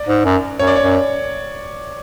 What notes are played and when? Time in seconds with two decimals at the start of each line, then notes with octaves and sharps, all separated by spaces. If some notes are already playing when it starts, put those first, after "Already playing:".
Already playing: D5
0.08 G#2
0.25 F#2
0.59 F#2 C#5
0.67 D5
0.76 C#5
0.82 F#2